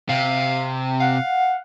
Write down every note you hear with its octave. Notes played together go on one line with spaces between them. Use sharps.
C3 F5
F5 F#5